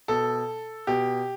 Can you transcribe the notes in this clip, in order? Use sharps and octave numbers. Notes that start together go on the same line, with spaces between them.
B2 A4
B2 G4